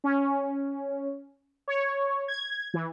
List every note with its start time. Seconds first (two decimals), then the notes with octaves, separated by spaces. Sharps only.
0.04 C#4
1.68 C#5
2.28 G#6
2.74 E3